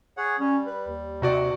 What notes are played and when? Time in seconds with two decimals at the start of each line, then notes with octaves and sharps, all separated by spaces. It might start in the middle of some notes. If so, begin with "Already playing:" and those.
0.17 G#4 C#5 F#5
0.39 G3 C#4
0.66 B4
0.88 D#2
1.22 C3 D#4 F#4 D5